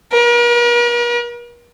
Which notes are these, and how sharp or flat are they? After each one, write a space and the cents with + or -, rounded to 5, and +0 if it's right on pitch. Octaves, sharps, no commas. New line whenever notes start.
A#4 +45